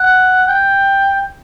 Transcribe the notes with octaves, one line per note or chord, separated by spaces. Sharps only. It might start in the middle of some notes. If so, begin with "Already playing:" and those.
Already playing: F#5
G5